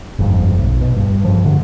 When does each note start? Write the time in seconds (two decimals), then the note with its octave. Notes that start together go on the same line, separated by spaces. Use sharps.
0.19 G1 F2 G#2
0.58 B1
0.81 B2
0.97 G2
1.25 G2 F3
1.45 D3 A3